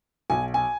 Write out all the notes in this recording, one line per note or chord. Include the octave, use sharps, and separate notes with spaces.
B1 G#5
G#5